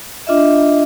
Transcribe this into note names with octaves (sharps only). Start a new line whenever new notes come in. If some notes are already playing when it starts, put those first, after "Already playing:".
D4 F4 D#5 E5